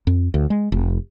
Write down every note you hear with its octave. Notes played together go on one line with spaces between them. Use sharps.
F2
D2
G#3
F1